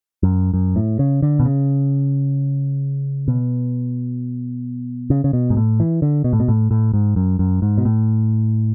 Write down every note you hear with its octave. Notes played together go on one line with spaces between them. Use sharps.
F#2
F#2
A2
C#3
D3
B2
C#3
B2
C#3
C#3
B2
G#2
A2
E3
D3
B2
A2
B2
A2
A2
G#2
F#2
F#2
G#2
B2
A2